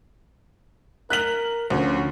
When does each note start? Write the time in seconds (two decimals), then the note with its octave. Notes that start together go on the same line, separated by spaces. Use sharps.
1.10 A#4 F#6 B6 F#7
1.70 D2 D3 F3 C#4